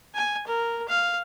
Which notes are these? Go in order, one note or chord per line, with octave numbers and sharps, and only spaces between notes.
G#5
A#4
F5